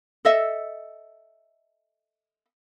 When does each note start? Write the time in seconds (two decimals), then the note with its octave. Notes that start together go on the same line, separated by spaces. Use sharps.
0.25 A4 D#5 E5